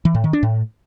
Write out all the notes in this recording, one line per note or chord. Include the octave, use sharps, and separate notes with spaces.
E3
A2
D#3
D4
A2